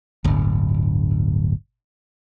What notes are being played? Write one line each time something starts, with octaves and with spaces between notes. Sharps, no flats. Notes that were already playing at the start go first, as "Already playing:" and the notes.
D1 G1